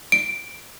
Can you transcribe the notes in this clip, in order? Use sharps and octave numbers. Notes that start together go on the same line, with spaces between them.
D7